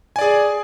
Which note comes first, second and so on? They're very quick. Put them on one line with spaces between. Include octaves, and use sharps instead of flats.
G#5 D5 G#4